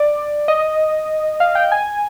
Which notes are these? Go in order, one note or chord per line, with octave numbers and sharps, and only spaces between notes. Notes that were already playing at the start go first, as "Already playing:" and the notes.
Already playing: D5
D#5
F5
G5
G#5